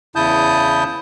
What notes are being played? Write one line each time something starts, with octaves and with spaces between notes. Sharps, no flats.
E2 C#3 E4 A5 D#6 G6